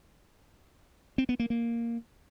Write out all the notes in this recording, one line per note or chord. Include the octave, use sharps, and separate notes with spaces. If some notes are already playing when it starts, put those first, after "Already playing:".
C4
B3
A#3
A#3